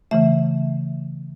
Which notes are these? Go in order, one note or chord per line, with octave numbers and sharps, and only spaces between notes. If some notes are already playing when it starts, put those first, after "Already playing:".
C#3 E3 A3 E5